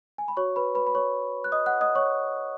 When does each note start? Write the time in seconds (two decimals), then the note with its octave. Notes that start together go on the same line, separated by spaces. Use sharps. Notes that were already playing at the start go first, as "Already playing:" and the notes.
0.18 G#5
0.28 B5
0.37 F#4 C#5 C#6
0.56 B4 B5
0.75 B4 B5
0.87 B5
0.95 C#5 C#6
1.44 F#6
1.52 D#5 D#6
1.66 F#5 F#6
1.81 D#5 D#6
1.95 C#5 C#6